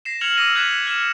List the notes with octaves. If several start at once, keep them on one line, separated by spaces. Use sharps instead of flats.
A#6 C7 E7
F6 G#6 C#7 F7 F#7
D6 E6 A#6 D#7 F7
F#6 G#6 B6 C#7 E7
F6 C#7 E7